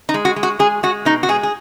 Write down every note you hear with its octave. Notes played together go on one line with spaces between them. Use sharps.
D#4
G#3
F#4
G#3
F#4
G#3 G#4
G#3 F#4
B2 D#4
F#4
G#3 G#4
G#4